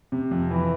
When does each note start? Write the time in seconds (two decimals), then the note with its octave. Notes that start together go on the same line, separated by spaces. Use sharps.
0.12 C3
0.31 F2
0.51 E3